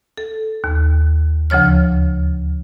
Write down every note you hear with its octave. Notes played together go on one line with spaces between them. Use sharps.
A4
D#2
D2 C#3 F3 C#5 F6